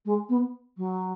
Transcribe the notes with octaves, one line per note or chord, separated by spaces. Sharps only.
G#3
B3
F#3